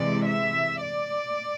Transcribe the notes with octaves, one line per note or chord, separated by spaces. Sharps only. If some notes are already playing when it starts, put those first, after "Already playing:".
Already playing: C3 E3 G#3 D5
E5
D5